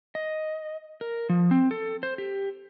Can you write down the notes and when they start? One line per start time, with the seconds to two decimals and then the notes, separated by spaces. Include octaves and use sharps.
0.15 D#5
1.01 A#4
1.29 F3
1.51 C4
1.71 A4
2.03 C5
2.18 G4